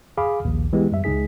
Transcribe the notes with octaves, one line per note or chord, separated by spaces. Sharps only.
G#4 F5 B5 D6
A#1 D#2
E3 G#3 B3 G4
F#2 G3 E5
C#2 G#3 D#4 G#4 B6